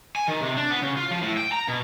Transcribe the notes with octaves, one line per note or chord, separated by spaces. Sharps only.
G#5
D#3
C3
D4
B3
C#3
F4
F3
A2
G5
A#5
B2